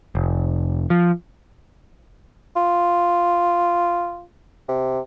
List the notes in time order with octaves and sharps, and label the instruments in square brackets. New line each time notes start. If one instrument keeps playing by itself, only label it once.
[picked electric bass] F1
F3
[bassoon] F4
C3